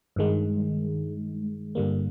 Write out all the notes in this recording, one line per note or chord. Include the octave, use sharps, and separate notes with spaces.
G2 D#3 G#3
G2 D3 G3 A#3